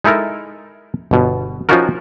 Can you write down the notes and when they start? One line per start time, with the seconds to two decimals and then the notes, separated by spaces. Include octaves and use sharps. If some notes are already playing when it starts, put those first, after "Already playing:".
0.04 G#3 D#4 E4 A4 A#4
1.11 G1 B2
1.69 F3 C#4 D#4 F4 F#4 A#4